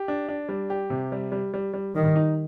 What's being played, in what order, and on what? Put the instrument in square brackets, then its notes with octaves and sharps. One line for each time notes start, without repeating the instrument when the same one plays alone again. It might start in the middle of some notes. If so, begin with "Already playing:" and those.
Already playing: [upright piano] G4
D4
D4
G3
G4
C3
G3
G3
G3
G3
[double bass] D#3 [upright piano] G3
[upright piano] D#4